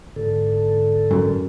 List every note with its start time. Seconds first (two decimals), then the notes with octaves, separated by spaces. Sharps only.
0.16 G#2 D3 A4
1.11 F#2